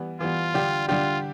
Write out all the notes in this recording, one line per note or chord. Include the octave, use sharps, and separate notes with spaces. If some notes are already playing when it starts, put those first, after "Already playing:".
Already playing: E3 G3 B3
E3 G3 B3 F4
D3 G3 D4 G4
D3 G3 D4 F4 G4